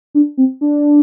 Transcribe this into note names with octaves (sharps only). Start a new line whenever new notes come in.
D4
C4
D4